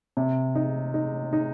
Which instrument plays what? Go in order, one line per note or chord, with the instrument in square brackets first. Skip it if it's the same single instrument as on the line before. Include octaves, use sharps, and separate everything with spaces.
[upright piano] C3
D#4
D#4
D#4